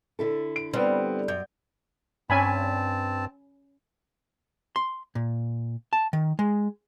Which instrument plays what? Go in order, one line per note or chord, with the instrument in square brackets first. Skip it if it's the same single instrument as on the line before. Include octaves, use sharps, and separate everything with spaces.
[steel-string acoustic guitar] D3 E4 A4
[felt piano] D7
[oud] G3 [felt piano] B3 C4
[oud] F#2 [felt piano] G6
[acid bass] G2 [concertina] C4 A5 [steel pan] C#4 G#5 B5
[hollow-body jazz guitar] C6
A#2
A5
D#3
G#3